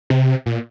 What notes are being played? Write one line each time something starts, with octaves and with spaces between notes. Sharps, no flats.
C3
A#2